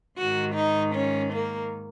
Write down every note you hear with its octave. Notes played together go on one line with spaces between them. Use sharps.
G#2 D#3 F#4
D#4
C#4
A#3